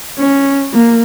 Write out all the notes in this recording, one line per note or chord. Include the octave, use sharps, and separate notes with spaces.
C#4
A#3